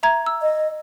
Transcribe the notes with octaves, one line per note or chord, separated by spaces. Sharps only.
E5 A#5 G#6
E6
D#5